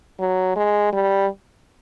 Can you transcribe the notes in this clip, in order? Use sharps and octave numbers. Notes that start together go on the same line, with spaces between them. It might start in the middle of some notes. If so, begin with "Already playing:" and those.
F#3
G#3
G3